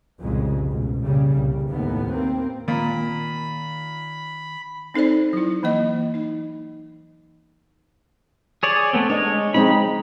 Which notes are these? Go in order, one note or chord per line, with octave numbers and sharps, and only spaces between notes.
C2 F2 A#2 C#3 G#3
A1 B2
A#2 C#3 G3
C2
D#2 A2 B3
A#3 C4
A#2 D#3 A#5 B5
C4 D#4 A4 C5 D5
F#3 E4
E3 A#3 D#5
D#4
G#4 C#5 D5
A3 B3 C4
G#3 D4 C#5 D#5
G#3 C4 D#4 B5